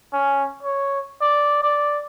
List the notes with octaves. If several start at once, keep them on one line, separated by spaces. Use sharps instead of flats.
C#4
C#5
D5
D5